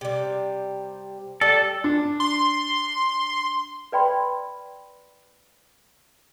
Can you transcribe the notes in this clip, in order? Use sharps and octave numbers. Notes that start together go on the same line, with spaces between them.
C3 G3
G3 A4
D4
C6
B4 D5 G5 B5 C6